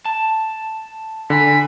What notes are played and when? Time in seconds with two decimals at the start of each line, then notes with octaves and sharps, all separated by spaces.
0.05 A5
1.30 D3 G#5 B5